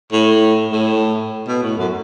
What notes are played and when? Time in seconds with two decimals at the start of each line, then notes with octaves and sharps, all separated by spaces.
0.12 A2
0.72 A2
1.47 B2
1.62 A2
1.77 F#2